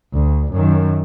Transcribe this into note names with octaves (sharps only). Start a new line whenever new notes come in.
D2
F#2 D#3